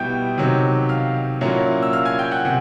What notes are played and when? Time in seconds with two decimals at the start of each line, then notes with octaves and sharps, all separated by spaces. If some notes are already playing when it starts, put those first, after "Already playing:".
Already playing: B2 G3 B3 E4 G5 G6
0.38 C3 D#3 F#3
0.89 F5 F6
1.41 A#2 F#3 A#3 C#4 E4
1.82 E6
1.93 F5 F6
2.05 G#5 G#6
2.19 G5 G6
2.31 F#5 F#6
2.45 C3 F#5